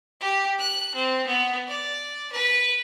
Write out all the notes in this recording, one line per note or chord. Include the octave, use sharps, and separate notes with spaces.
G4
F#6
C4
B3
D5
B4